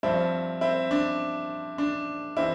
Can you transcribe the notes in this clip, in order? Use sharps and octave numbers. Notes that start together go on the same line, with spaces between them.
G2 F3 C4 E4
C4 E4
D4
D4
E3 C4 E4